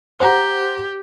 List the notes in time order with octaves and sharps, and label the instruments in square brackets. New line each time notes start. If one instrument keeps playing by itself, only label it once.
[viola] G4 [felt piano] C5 F#5 A#5